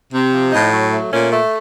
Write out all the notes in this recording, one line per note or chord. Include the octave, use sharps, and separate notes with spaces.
C3
F3
A2 D#4
F#3
A3
A#2 C#4
A3